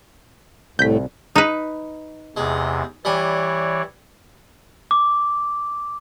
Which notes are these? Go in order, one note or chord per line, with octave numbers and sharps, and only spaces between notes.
C2 A2 A3 G6 B6
D#4 B4
E2 C3 G#3
E3 G3 C#5 D5 G#5
D6